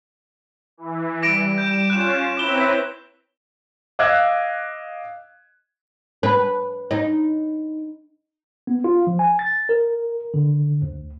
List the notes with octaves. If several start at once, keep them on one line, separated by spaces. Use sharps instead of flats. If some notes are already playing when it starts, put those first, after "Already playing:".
E3
G3 D6 A#6 D7
G6 E7
C#4 F4 F#6 E7
C4 E4 B4 C#5 A#5 D6 G7
D#5 F5 D6 E6 F#6 G#6
B4
D#4
B3
F4
F3
G#5
A6
A#4
D3
D2